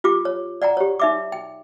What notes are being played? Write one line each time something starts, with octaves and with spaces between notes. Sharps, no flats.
F4 G4 D6
C#5
D5 F#5 G5 A#5
G4 C#5
D#4 E5 D6
G5